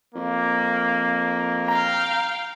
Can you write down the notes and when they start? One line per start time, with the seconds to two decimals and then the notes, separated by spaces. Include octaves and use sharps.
0.15 F2 A#3
1.68 F5 G5 A#5